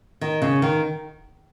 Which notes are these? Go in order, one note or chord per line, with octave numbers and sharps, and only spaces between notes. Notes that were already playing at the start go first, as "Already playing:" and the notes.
D#3
C#3
D#3